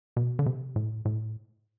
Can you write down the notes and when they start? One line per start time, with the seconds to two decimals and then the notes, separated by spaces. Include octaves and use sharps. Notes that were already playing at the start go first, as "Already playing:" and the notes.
0.17 B2
0.39 D3
0.46 C3
0.76 A2
1.05 A2